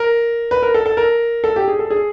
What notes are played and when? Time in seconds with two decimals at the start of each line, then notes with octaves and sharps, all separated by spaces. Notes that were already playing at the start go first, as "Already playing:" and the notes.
Already playing: A#4
0.51 B4
0.62 A#4
0.74 A4
0.86 A4
0.97 A#4
1.44 A4
1.56 G4
1.68 G#4
1.79 A4
1.90 G#4